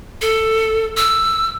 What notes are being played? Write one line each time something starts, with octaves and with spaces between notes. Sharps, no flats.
A4
E6